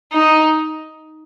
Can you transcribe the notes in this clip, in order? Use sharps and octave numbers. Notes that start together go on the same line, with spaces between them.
D#4